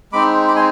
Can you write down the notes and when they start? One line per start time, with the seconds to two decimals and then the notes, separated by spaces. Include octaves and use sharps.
0.12 G#3 C4 D#4 B5 D6
0.48 B5 D6
0.56 G#5 C6